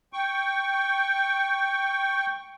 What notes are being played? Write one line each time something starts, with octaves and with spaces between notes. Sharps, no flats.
G5 C#6